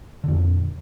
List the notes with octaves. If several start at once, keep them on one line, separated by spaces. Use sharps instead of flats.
F2 A#2 D3